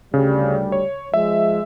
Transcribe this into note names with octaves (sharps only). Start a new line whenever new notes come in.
D2 C#3 G3
C#5
F3 G#3 E5